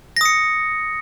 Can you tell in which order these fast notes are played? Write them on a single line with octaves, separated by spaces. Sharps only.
A#6 D#6 C#7